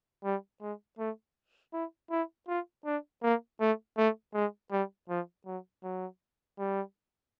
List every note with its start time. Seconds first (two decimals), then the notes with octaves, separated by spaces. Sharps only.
0.24 G3
0.61 G#3
0.99 A3
1.73 E4
2.11 E4
2.48 F4
2.85 D4
3.23 A#3
3.60 A3
3.97 A3
4.34 G#3
4.71 G3
5.09 F3
5.46 F#3
5.83 F#3
6.58 G3